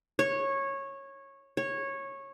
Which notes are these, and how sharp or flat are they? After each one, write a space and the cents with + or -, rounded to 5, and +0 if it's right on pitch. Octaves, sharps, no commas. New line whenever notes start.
C#5 -15
C#5 -15